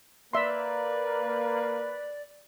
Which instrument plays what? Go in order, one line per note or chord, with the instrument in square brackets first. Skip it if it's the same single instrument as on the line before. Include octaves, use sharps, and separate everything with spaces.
[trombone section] A#3 [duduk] B4 [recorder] D5 [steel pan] E5 C6